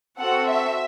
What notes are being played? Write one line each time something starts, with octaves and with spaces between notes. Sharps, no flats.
C4 F#4 A4 F#5
E5